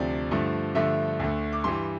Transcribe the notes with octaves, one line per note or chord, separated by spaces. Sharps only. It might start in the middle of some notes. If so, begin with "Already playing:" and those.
Already playing: D2 C3 F3 D5
G2 D3 F3 A3
G2 D3 F3 A3 E5
D2 D3 A3
D6
G2 E3 G3 C6